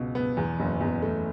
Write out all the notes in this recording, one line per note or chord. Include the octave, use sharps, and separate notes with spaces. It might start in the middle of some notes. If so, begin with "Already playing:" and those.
Already playing: C#2 B2
B3
E2
F#1
E2
A3